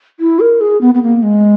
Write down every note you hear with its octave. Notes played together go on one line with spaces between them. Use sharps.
E4
A#4
G#4
B3
B3
A#3
G#3